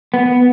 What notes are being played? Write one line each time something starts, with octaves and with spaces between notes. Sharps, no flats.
B3